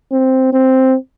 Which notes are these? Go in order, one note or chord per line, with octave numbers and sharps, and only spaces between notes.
C4
C4